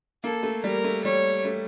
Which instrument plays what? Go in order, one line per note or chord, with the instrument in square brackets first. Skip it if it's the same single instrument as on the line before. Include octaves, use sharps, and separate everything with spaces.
[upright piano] A#3 [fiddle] A4
[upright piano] A3
[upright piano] G3 [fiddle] A#4
[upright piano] A3
[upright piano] G3 [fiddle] C#5
[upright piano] A3